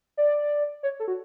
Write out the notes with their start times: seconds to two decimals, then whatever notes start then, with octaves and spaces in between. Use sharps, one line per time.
0.17 D5
0.83 C#5
1.00 A4
1.08 F#4